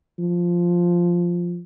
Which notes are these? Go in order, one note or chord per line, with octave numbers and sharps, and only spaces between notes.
F3